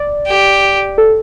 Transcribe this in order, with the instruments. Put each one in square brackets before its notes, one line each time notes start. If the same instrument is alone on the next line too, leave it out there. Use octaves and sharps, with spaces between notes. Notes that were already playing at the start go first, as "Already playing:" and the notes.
Already playing: [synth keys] D5
[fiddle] G4
[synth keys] A4